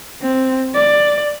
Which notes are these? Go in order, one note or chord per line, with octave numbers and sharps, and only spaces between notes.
C4
D5